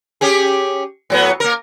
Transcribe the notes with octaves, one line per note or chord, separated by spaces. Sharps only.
C#4 G4 G#4
A2 F#3 B3
A#3 A#4